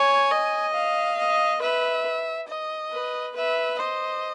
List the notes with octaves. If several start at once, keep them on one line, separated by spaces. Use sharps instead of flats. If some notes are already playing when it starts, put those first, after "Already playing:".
Already playing: C#5 G#5
D#5
F5
D#5
B4 E5
D#5
B4
B4 E5
C5 D#5